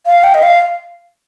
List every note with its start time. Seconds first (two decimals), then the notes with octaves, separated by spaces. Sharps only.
0.06 F5
0.24 G5
0.34 D#5
0.43 F5